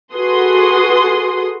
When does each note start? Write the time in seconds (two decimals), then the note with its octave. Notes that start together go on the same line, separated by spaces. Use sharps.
0.14 F#4 G#4 A4 B4 C6 D#6